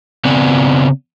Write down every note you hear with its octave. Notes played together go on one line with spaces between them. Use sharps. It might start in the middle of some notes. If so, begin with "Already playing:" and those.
C#3 B3 C4 D5 F#5 G#5